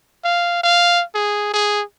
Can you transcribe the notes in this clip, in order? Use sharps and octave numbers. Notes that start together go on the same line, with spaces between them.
F5
F5
G#4
G#4